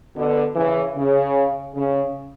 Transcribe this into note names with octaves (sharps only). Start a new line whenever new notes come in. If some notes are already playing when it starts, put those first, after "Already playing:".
B2 D3
C#3 E3
C#3
C#3